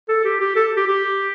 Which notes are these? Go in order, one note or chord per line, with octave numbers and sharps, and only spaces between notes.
A4
G4
G4
A4
G4
G4